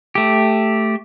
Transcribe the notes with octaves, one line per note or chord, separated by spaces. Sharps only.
A3 G4